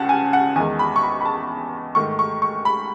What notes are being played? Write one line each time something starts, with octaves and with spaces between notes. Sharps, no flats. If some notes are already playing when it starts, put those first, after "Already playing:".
Already playing: C#2 C#3 F#5 A5
G#5
F#5
E2 D#3 G#3 G#5
B5
C#6
B5
B5
A5
G#2 D#3 A3 C#6
C#6
C#6
B5